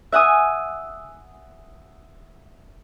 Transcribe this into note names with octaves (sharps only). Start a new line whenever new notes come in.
E5 F#5 G#5 D#6